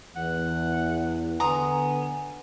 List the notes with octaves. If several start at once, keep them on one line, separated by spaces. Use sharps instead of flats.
E2 F#5
D3 B3 G#5 A#5 C6 D#6